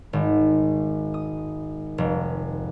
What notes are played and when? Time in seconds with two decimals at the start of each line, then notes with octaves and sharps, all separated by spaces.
0.13 G#1
1.14 D#6
1.98 F1